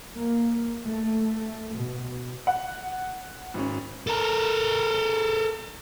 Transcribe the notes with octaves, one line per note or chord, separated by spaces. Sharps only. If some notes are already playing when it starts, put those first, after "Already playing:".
A#3
A3
B2
F#5
G#1 C#4
A4 A#4